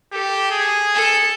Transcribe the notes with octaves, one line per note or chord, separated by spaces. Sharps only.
G4 A4
G#4
A4 A5